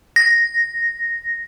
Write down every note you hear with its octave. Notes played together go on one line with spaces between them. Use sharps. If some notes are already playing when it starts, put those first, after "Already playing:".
A#6